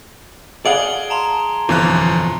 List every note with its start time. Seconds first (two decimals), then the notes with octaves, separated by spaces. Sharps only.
0.66 G#4 D5 F5 F#5 D7 G7
1.10 A5 A#5 C6
1.69 G1 F2 B2 E3 F3 F#6